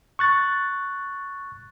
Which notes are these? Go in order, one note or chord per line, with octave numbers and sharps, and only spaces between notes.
C#6 F#6 A6